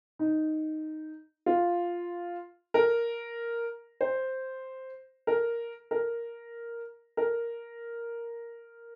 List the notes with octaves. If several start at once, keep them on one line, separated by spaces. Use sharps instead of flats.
D#4
F4
A#4
C5
A#4
A#4
A#4